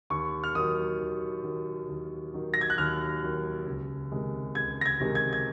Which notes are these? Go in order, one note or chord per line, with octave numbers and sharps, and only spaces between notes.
D#2 C#6
F6
D#3 F#3 D#6
D#2
D#3 F#3
D#2
D#3 F#3
A#6
G#6
F#6
D#2 F6
D#3 F#3
C#2
C3 D#3 G#3
C#2 G#6
A#6
G#6
C3 D#3 G#3
G#6
G#6